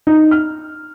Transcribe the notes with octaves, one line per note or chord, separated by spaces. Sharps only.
D#4
F6